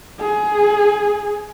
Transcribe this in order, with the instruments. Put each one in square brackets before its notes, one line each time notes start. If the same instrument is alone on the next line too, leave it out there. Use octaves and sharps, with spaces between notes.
[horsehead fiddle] G#4